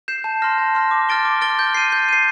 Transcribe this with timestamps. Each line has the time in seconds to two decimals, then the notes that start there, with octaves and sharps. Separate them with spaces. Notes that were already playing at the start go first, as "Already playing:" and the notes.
0.08 G6 C7 E7
0.24 A5
0.42 C6 F6 A#6
0.58 A5
0.75 C6 F6 A#6
0.91 D6
1.09 F6 A6 D7 G7
1.25 D6
1.41 F6 A6 D7 G7
1.59 G6
1.74 C7 D#7
1.92 G6
2.09 C7 D#7